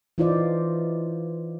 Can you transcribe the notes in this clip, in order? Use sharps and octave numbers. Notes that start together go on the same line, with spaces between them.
E3 D#4 F4 C5 D5